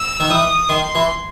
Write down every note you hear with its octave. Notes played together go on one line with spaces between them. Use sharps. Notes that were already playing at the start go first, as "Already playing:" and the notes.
Already playing: E6
D#3
E3 D#6
D#3 C6
E3